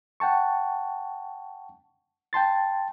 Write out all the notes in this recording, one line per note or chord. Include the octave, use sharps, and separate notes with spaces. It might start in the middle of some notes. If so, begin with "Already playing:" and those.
F#5 G5 A5 C#6
G5 A5 C6 A6